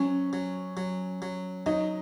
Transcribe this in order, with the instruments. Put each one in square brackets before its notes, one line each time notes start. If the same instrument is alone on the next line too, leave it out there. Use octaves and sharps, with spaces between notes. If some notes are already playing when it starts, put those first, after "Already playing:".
Already playing: [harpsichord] F#3 [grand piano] C#4
[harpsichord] F#3
F#3
F#3
[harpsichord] F#3 [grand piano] D#4